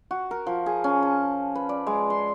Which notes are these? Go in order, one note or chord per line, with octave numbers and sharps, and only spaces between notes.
F#4
A#4
F3
G#4
C#4
A5
B4
D5
G#3
C6